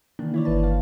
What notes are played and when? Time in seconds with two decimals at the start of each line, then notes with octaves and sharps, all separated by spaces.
0.19 C3 D#3 E3 A#3 D4
0.34 E4 C#5 D5
0.45 G1 B4 A5
0.63 F5